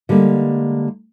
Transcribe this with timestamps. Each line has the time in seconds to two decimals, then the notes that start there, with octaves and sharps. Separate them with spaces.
0.09 D3 G3 G#3 A#3